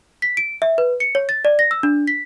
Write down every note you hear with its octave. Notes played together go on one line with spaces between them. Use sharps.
B6
D7
E5
B4
C#7
C#5
A6
D5
A#6
E6
D4
B6